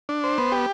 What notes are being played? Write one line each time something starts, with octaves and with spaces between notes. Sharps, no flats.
D4
C5
B3
G4